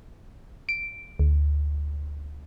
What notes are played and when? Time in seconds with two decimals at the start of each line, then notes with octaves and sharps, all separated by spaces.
0.69 D7
1.19 D2